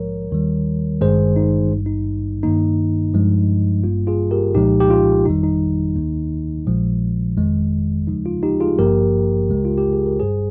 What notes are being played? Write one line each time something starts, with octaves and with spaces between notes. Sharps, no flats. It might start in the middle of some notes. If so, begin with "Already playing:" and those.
Already playing: A#1 G#2 F3 G#3 A#4 C#5
D#2 D#3 G3
G#1 G2 D#3 G#3 G#4 C5
D#4
G#1 G2 G3 D#4
D#4
G2 D#3 A#3 D#4
G2 F3 G#3
G#1 G2 G3 A#3 F4
F4 G#4
G4 A#4
C2 A#2 F3 G#3 D#4 G4
G4
F4
G1 F2 D#3 G3 D#4
D#4
D#2 D#3 A#3
A#1 A#2 F3 G#3
G1 F2 D#3 G#3
D#2 C#3 F3 G#3 D#4
F4
D#4 G4
F4 G#4
G#1 G2 F3 A#3 G4 A#4
C#2 C#3 G#3
F4
G4
G#4
A#4
G1 G2 G3 G#4 C5